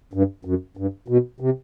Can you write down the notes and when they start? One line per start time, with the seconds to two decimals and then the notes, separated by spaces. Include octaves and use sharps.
0.14 G2
0.45 F#2
0.77 G2
1.08 B2
1.40 C3